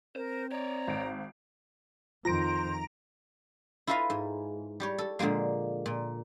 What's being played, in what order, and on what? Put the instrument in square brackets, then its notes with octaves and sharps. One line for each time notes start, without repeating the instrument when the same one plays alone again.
[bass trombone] C4 [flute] A#4 [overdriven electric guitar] C5
[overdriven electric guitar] C#5 D5 [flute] A#5
[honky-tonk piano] G#1 D7
[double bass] F2 D#3 [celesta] F4 [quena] C5 [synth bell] A#5 A#6 D7
[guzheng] E4 F4 A4 B4 D#5 F5
G#2
G3 G4 C#5
A4
A#2 D3 F3 G#3 A#3
A#2